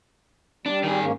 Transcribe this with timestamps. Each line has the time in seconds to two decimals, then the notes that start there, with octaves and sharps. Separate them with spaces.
0.66 G3 D4
0.84 D#3 G#4
1.01 G#2 A#3 C#4